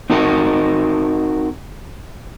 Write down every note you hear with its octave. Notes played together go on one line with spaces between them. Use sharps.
C4 D#4 F#4 A#4